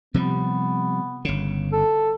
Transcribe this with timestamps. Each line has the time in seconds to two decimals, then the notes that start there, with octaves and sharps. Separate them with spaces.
0.14 C3 F3 G3 B3
1.25 G1 C#3
1.72 A4